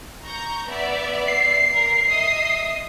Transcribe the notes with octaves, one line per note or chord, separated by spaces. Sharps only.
A#5 C#6 G6
B3 D5 E5
C7
A#4
D#5 E5 D#6